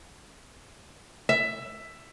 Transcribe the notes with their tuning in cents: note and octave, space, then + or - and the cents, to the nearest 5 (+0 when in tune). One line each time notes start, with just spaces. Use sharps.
E5 +15